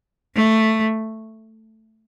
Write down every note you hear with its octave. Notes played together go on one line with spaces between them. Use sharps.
A3